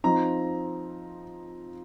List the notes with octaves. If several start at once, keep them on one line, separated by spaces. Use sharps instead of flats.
F3 C4 D#4 A#5